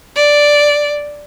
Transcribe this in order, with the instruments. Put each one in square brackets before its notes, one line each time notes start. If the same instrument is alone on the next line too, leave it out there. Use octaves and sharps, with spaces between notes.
[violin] D5